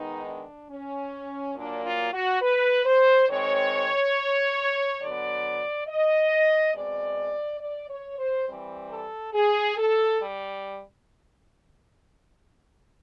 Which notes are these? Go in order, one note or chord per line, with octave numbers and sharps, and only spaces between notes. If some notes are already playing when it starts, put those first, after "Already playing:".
Already playing: D#3 G#3 B3 D#4
D4
C#4
A#2 F#3 A#3 D4
F4
F#4
B4
C5
D#3 G#3 C4 C#5
D3 F#3 B3 D5
D#5
B2 G#3 C4 D5
D5
C#5
C5
E3 G3 C4
A4
G#4
A4
G3